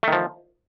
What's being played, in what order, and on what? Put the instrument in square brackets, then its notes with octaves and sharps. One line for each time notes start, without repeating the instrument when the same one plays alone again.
[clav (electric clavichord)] A3
D#3
F3